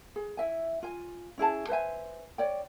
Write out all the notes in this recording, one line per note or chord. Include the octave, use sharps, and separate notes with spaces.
G#4
E4 E5 G#5
F4 G#5
C#4 E4 G#4 A5
B4 C5 E5 G#5
C#5 D5 G5